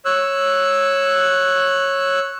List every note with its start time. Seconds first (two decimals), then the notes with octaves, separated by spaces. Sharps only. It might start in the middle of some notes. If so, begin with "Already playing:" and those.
0.05 C#5 E6 F#6